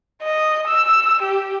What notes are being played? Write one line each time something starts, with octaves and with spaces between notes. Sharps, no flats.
D#5
E6
G4